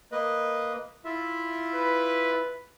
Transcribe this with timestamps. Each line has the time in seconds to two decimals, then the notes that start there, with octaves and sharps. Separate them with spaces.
0.12 A#3 B4 D#5
1.05 E4 F4 E5
1.74 B4